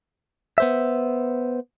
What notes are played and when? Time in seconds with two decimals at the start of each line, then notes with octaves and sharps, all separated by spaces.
0.58 B3 C5 E5